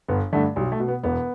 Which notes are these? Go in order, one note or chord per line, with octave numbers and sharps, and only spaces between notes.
G1 B3
G2 D3 A3
B1 G3
A3
B2
B3
E1 B3